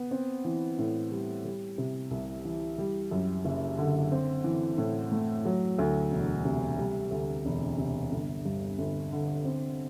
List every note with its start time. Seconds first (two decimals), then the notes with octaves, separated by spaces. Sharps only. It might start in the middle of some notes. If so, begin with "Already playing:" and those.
Already playing: B3
0.11 C4
0.44 E3
0.78 A2
1.11 G3
1.45 G3
1.78 C3
2.11 C2
2.45 E3
2.78 G3
3.11 F#2
3.45 F#1
3.78 D3
4.12 C4
4.44 E3
4.78 A2
5.12 A3
5.45 F#3
5.79 D2
6.11 E1
6.45 C3
6.78 G3
7.11 D2
7.45 E1
7.78 C3
8.12 G1
8.45 G2
8.79 G1
9.12 D3
9.45 C4